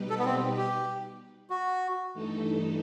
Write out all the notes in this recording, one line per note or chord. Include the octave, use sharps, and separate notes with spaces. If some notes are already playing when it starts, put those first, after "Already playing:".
Already playing: B2 G3 D#4 G4 B4
A4
B3
C4
G4
F#4
G2 E3 A3 D#4 A4